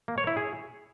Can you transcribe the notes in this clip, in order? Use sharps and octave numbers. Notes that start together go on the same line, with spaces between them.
A#3
C#5
E4
G#4